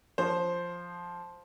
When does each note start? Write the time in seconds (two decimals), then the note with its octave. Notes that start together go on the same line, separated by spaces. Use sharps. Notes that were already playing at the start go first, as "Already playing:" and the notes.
0.18 F3 C5